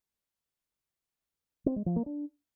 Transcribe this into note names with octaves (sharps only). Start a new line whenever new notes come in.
C4
G#3
F3
A#3
D4